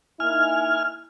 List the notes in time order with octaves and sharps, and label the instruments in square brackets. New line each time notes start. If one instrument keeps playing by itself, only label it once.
[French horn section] A#3 D#4 E4 [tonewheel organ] G#5 F6